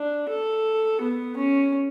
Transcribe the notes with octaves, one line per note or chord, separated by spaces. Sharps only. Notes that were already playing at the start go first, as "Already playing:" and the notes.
Already playing: D4
A4
B3
C#4